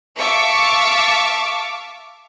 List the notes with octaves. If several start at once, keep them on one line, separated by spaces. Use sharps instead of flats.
E5 F5 A5 C#6 D6